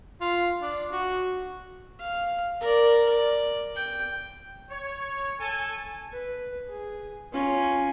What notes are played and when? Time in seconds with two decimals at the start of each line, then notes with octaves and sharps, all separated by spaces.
0.21 F4
0.61 D4
0.92 F#4
1.99 F5
2.61 A#4 D5
3.09 D5
3.76 G5
4.70 C#5
5.40 A4 G#5
6.13 B4
6.69 G#4
7.33 C#4 F4